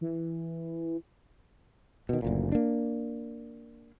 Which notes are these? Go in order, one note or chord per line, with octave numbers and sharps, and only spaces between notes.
E3
B2 D#3
F#1 D2 A#2
A#3 D4